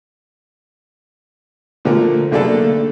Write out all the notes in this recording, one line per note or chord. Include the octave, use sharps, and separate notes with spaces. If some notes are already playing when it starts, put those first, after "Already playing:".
A#2 D3 F3 A3 A#4
B1 D3 A3 A#3 D4 A4